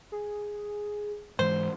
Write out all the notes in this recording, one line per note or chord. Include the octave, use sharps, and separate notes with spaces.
G#4
G#2 E3 G#3 C5